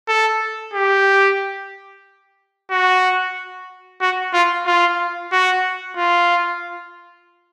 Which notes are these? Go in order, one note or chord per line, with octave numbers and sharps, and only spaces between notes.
A4
G4
F#4
F#4
F4
F4
F#4
F4